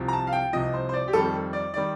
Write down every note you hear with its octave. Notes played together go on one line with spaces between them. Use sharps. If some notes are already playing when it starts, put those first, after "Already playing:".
Already playing: C2 C3 F3
A#5
A5
F5
G5
C2 C3 F3 D#5
C5
C5
D5
G4
F2 D#3 G3 A4
D5
D#3 G3 D5